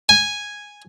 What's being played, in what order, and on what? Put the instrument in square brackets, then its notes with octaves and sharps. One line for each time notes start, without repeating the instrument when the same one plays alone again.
[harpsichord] G#5